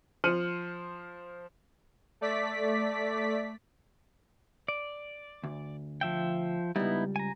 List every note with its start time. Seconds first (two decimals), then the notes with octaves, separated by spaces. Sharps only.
0.24 F3 C5 F6 C#7 D#7 F#7
2.21 A3 D5 B6
4.68 D5
5.43 D2
6.01 F3 E5 G5
6.76 C#2 G3 B3 D#4 E4
7.16 G#5 A#5